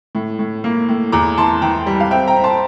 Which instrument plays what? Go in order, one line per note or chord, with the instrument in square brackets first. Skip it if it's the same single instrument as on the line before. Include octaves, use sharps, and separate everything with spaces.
[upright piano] A2
A2
A#3
A2
E2 A#5 D6
E3 A5 C6
E3 G5 A#5
G3
F5
C4 E5 G5
G5 A#5
C4
A5 C6